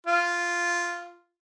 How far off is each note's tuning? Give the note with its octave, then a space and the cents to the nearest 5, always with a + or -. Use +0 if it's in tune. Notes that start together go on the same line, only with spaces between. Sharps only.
F4 -5